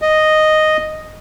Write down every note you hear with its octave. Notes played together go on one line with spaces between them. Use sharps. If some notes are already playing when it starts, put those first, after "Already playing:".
D#5